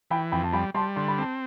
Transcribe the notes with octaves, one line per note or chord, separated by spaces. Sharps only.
E3 G5 B5
F2 G5 B5
A5
G3 G5 B5
G3 A5 C6
D3 C6
B5
C4 A5